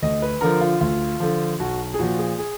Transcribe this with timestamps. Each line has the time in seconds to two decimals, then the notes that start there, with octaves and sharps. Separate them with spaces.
0.02 D2 D#5
0.22 B4
0.41 D3 F3 A#4
0.61 F4
0.81 D2 F4
1.20 D3 F3
1.59 B1 F#4
1.94 G#4
1.99 A#2 F3 F#4
2.18 G#4
2.39 G#4